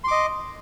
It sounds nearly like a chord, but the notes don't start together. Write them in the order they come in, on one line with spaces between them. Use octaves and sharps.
C6 D6 D#5